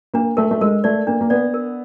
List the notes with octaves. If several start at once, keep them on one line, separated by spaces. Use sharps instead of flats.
A#3 D4
A3 A#4
A3
G#3 A#4
A3 D5
A#3 D4
A#3
B3 D5
A#4